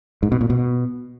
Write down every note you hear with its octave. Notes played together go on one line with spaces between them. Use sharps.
G#2
B2
A#2
B2